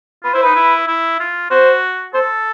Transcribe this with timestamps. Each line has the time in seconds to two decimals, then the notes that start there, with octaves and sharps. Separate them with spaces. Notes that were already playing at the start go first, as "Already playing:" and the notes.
0.24 F4 B4
0.34 E4 C5
0.42 D#4 B4
0.55 E4
0.88 E4
1.20 F4
1.51 F#4 C5
2.14 A4 C5